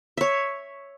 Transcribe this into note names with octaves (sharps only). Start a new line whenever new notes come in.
C#5 E5